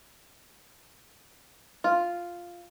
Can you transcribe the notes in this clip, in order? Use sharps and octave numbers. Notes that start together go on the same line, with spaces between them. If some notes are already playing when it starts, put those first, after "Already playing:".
F4